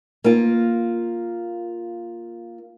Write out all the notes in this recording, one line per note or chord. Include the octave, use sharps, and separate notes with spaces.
A#3 F4